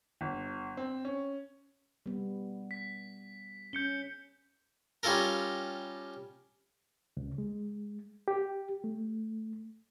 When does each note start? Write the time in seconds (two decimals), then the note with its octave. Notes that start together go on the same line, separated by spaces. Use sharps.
0.21 G1
0.77 C4
1.05 C#4
2.06 G3 B3
2.71 B6
3.73 C#4 G6 C#7 G7
5.03 G3 C#4 F4 A4 A#4
7.17 C#2
7.38 G#3
8.28 G4
8.84 A3